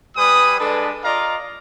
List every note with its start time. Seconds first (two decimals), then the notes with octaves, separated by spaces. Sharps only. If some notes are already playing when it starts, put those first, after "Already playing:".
0.16 G3 B4 G#5 D#6
0.59 G#3 D4 A4 B4
1.03 F4 D5 D#5 F5 A#5